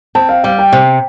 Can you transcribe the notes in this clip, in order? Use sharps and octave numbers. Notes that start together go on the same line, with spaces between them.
C4 A5
F5
G3 F5
G5
C3